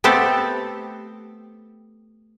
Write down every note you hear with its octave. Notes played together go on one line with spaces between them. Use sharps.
A3 B3 C4 G4 A4